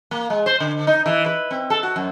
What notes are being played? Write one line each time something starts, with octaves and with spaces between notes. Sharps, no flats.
A#3
G#3
C5
D3
D#4
E3
B4
C4
A4
F#4
F#2